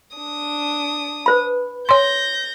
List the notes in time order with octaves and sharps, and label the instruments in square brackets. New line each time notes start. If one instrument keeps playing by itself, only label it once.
[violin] D4 D#6
[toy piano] B4 C5 B5
[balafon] C#5 C6 [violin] G6 A#6